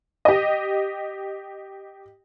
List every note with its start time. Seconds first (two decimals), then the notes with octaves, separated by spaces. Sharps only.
0.25 G4 D#5